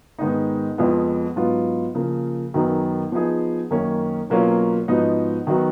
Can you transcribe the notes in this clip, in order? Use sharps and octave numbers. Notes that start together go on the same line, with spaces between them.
G#2 D#3 G#3 B3 D#4
F2 F3 G#3 B3
G#2 F#3 B3 F4
C#3 F3 A#3
F#2 D#3 F#3 B3 D#4
F3 B3 D#4 G#4
F#2 D#3 A#3 C#4
B2 F#3 A#3 C#4 F4
G#2 F3 B3 D#4 F#4
D#3 F#3 B3 F#4